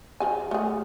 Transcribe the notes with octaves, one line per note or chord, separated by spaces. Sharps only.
F3 G#4 G#5
A3 G#4